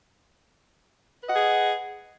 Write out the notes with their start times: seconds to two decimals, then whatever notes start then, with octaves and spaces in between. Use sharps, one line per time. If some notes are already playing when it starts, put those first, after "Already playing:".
1.22 B4
1.26 D#5
1.30 F#5
1.34 G#4